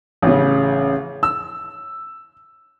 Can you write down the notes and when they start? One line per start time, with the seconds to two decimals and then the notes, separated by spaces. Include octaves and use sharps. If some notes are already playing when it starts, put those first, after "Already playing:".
0.22 A1 C#3
1.23 E6